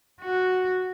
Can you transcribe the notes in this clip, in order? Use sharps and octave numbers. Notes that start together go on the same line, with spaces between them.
F#4